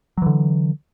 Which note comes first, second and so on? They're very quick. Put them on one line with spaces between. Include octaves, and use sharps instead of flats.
F#3 E3 D3